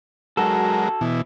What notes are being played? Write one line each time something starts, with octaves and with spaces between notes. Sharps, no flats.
F#3 G#3 F#4 A4 A#4
B2 E3